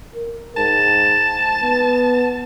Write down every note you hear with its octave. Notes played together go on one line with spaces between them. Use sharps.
A#4
G#2 A5
B3